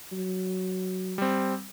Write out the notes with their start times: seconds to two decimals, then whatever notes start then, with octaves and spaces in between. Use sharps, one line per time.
0.12 F#3
1.18 G3 C4